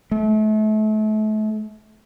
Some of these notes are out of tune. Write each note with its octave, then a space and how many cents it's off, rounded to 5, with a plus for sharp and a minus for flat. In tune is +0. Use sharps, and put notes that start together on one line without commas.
A3 -35